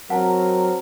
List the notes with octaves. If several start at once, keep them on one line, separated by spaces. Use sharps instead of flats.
F#3 C4 A#4 F#5 A5